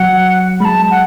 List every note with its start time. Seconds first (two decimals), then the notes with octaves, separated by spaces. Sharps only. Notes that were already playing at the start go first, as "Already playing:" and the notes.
Already playing: F#3 F#5
0.60 G#3 A5 B5
0.91 F#5